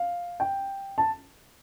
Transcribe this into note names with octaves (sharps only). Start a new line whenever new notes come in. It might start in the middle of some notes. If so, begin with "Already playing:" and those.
Already playing: F5
G5
A5